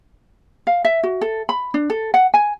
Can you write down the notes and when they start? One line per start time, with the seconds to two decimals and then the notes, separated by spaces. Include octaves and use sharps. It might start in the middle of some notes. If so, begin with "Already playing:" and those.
0.67 F5
0.85 E5
1.03 F#4
1.21 A4
1.49 B5
1.74 D4
1.90 A4
2.14 F#5
2.34 G#5